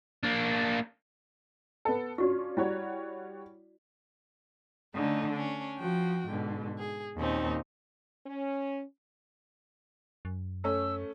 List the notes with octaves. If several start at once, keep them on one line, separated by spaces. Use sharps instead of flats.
A#3 D4
B3 A4
C#4 D4 F4 F#4 C#6
G3 E4 F#4 C#5 D5
D3 A3 C#4 D#4
C#4 D4
F3 F#4 G5
G#2 B2 D3
G#4
D#2 A#2 C4 C#4 D#4
C#4
F#2
A3 C#4 E6